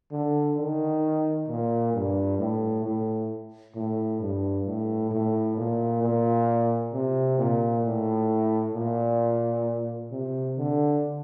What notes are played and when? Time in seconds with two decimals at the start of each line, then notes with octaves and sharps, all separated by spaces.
0.11 D3
0.57 D#3
1.48 A#2
1.94 G2
2.38 A2
2.84 A2
3.75 A2
4.21 G2
4.66 A2
5.11 A2
5.57 A#2
6.02 A#2
6.93 C3
7.38 A#2
7.85 A2
8.75 A#2
10.11 C3
10.57 D3